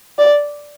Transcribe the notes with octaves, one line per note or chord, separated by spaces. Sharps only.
D5